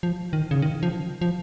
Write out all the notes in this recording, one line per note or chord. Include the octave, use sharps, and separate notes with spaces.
F3
D#3
C#3
D#3
F3
F3